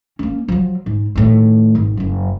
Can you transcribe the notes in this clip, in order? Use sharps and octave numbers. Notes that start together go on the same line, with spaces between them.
A#3 C#4
F3 F#3
G#2
A2 D#3
G#1
F#1 F#2